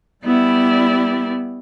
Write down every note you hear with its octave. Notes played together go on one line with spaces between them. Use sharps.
G3 B3 E4 G4 D5